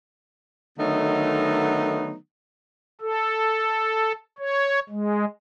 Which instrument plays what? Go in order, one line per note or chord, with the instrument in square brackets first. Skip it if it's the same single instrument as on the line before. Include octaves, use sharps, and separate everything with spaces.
[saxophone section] D3 D#3 F#3 A3 B3 D#4
[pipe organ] A4
C#5
G#3